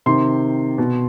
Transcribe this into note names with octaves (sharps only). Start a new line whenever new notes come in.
C3 D#3 C6
B2